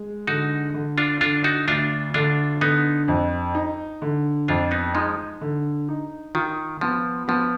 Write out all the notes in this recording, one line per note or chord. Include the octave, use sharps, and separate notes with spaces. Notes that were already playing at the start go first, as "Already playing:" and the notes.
Already playing: G#3
D3 D#4 F#4
D3
D4 F4
D3 D4 F4
D#4 F#4
D2 D4 F4
D3 D4 F4
D3 B3 D#4
F2
D#4
D3
F2 D4 F4
B3 D#4
F3 G#3 D#4
D3
D#4
D#3 F4
F3 B3
F3 B3